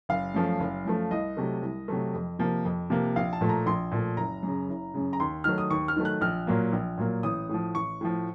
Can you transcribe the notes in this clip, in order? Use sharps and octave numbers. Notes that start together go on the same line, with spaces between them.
F#1 F5
F#2 F3 A3
F#1
F#2 F3 A3
C2 D#5
C3 F#3 A3
C2
C3 F#3 A3
F2
C3 F3 A#3
F2
C3 F3 A#3
A#1 F5
A5
A#2 F3 A3
A#5
A#1 C6
A#2 F3 A3
F#1 A#5
F#2
C#3
F#1
F#2 C#3
A#5
D#2 C6
D#3 F#3 A3 F6
D#6
D#2 C#6
F6
D#3 F#3 A3
F#6
A#1 F6
A#2 F#3 A#3
A#1
A#2 F#3 A#3
A1 D#6
A2 F3
A1 C#6
A2 F3